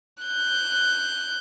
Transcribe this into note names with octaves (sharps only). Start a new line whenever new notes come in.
F#6 G6